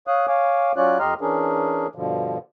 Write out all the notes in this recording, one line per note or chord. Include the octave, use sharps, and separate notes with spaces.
C#5 F5 D#6 F#6
C#5 F5 G#5 D6
F#3 C#4 F4 C#5 D5 F#6
F2 G4 D#5 A#5 C6 F6
E3 C#4 D4 G#4 A#4
G2 B2 D3 F3